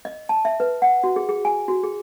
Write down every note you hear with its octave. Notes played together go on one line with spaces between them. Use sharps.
D#5
A5
E5
B4
F#5
F#4
G#4
G#4
G#5
F#4
G#4